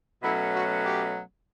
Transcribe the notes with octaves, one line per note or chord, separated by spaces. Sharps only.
B2 F#3 A3 C#4 E4
F#4
G4